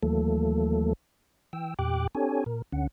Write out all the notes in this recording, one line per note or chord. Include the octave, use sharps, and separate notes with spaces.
D#2 E3 F#3 A3 A#3 A4
E3 G5 E6
E2 A#2 G4 G5 D6 F#6
C4 D4 G4 A4 C#5 G#5
A#2 A#4
D2 D3 C#4 F#5